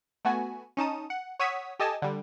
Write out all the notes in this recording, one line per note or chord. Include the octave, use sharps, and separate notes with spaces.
A3 B3 F#4 G#5
C#4 D#4 A5 D#6
F#5
C#5 F#5 D#6 E6 G#6 B6
G4 A4 D#5 G#5 A5
D3 G3